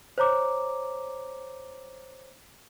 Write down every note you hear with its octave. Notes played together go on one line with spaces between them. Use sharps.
C5 C#5 A#5 D6